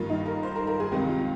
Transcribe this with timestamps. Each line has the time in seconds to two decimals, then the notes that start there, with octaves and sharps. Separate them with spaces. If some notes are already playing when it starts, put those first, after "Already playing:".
Already playing: G2 D#3 A#3 F4
0.10 D#4
0.26 A#4
0.43 C5
0.55 A#4
0.67 A#4
0.80 G#4
0.91 C#2 C3 D#3 G4
1.09 F4